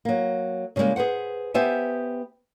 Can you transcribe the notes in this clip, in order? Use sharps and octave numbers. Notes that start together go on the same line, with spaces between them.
F#3 A#3
C#3 F3 G3 G#3 A#3
G#4 B4 C5 F#5
B3 G4 C5 E5 F#5 G#5